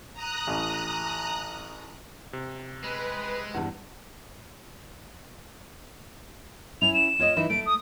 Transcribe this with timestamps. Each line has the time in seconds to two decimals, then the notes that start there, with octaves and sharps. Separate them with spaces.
0.14 A#5 D#6 F#6
0.47 A1
2.33 C3
2.84 G#3 B4
3.54 E2 G2
6.82 C#4 E4 F7
6.94 E7
7.19 F4 C#5 D#5
7.36 E3 D#4 E4
7.50 A3 D7
7.66 D#6